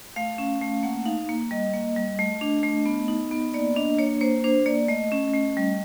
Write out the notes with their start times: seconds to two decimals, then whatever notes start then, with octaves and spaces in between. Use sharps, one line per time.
0.16 A3 F5
0.38 C#4
0.61 A3
0.83 A#3 F#5
1.05 D#4 F5
1.29 A#3
1.51 G3 D#5
1.73 A#3
1.96 G3
2.19 A3
2.41 D4
2.63 A3
2.86 B3
3.08 D#4
3.31 B3
3.54 A#3 D5
3.76 D4 D#5
3.99 A#3 C#5
4.21 A#3 C5
4.44 D4 C5
4.66 A#3 D5
4.88 A3 D#5
5.12 C#4
5.33 A3
5.57 G3